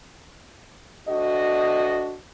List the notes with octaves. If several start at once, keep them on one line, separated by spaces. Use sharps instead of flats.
D2 D4 F#4 D#5